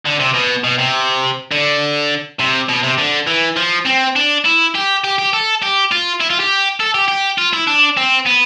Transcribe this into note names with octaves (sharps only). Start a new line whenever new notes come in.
D3
C3
B2
B2
C3
D3
C3
B2
C3
D3
E3
F3
C4
D4
E4
G4
G4
G4
A4
G4
F4
E4
F4
G4
A4
G4
G4
F4
E4
D4
C4
B3